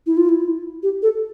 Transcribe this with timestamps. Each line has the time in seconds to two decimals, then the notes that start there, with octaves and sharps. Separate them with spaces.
0.06 E4
0.17 F4
0.29 E4
0.83 G4
1.02 A4